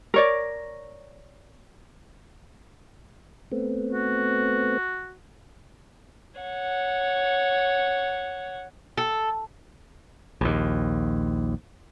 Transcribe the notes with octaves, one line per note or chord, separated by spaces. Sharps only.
A#4 C#5 D5
A3 B3 C4
F#4
C#5 F#5
A4
A#1 D#2